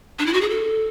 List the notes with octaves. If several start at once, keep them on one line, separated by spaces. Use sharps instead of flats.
D4
E4
F#4
G#4
A4